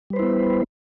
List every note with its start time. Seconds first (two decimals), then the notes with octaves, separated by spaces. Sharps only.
0.10 G3
0.13 B4
0.16 C5
0.19 E4
0.22 B3